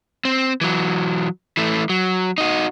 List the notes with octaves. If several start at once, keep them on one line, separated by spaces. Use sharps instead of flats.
C4
E3 F#3
E3 A3
F#3
D#4 F#4